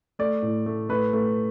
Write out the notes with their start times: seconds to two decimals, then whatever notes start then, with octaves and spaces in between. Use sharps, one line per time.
0.19 A3 D5
0.42 A2
0.66 A3
0.89 A3 B4
1.13 A3